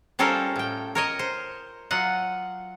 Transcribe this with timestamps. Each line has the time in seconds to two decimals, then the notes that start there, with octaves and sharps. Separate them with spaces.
0.19 G3 C#4 F4 A4 A#4 C5
0.56 A2 G5
0.95 A#4 C#5 D#5
1.19 C5
1.91 F#3 F4 D#5 F#5